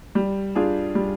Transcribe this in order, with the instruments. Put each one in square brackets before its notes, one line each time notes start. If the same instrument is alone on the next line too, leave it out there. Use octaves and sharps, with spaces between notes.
[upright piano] G3
D4 F4 G#4
G3